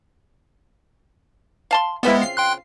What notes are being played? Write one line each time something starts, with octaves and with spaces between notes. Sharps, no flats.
F5 A5 C6
C#3 G#3 B3 C4 E4 F4 B4 B6
C7
G5 C6 F#6